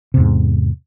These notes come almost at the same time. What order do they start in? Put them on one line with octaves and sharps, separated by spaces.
C3 E2 G#2